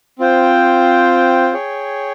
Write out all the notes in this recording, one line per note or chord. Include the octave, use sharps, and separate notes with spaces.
C4 F4 C5 G5
G#4 C#5 G5